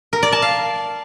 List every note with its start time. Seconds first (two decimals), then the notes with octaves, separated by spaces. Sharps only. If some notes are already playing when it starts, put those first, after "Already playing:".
0.13 A#4
0.23 D5
0.32 A5
0.42 F5